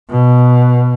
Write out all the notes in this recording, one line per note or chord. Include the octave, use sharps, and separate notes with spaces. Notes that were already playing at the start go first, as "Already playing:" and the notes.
B2